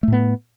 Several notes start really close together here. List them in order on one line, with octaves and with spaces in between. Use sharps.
A3 A2 B3